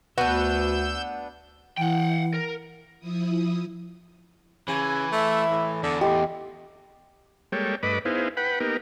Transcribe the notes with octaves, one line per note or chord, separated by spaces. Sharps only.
D2 B3 D4 F#4 E6 G6
E3 F#5 G5
A#4
F3 E4 D#6
C#3 E3 G#5
A3 E5
A2
E2 D3
A2 G4 D#5 C6
G3 G#3 A#3 A4 C#5 G5
G2 A3 B4 D#5 B5 D6
B3 D#4 E4 G#4 C5 F5
B4 F#5 G5 B5
A#3 B3 D#4 G4 A#4